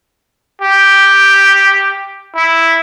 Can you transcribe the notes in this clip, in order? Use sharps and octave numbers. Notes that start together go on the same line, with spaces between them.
G4
E4